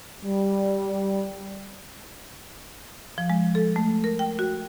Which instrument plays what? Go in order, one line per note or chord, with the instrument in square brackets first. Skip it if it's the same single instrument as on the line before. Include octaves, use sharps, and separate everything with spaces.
[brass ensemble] G3
[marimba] F3
G#3
A4
A3
A#4
G5
F#4